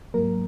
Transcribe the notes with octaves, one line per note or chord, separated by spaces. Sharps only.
G#2 F#3 A#3 A#4